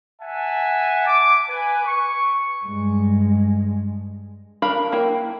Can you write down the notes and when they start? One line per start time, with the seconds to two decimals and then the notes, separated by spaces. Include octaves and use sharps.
0.21 E5 F#5 G#5 A5
1.06 D6
1.49 B4 G#5
1.85 C#6
2.65 G2 G#3
4.62 D4 A#4 F5 B5
4.92 A#3 E4 G5